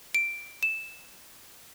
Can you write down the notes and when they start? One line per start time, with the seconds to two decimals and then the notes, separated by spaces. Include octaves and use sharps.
0.15 D7
0.63 E7